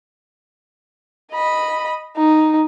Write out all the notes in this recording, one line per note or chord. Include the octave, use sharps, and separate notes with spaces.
D#5 B5
D#4